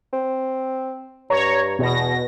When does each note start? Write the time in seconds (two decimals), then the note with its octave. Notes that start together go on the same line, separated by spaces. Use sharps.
0.13 C4
1.30 G2 C#5 A#5
1.79 E2 B2 A#6